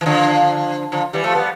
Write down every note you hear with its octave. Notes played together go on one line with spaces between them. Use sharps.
E3
D3 F3
D3 F3
E3 G3
F3 A3
G3 B3